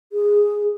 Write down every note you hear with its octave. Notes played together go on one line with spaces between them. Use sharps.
G#4